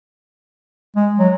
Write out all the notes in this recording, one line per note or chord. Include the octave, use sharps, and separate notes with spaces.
G#3
F#3